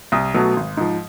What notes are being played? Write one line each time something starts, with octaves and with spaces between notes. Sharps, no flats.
C2 D#6
B2 F#3 A3
G#1
G#2 F3